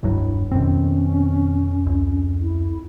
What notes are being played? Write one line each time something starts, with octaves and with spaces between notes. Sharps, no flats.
E1 C#2 G2 F#3 E4
F2 B2 D#3 C4 C#4
C#2
E4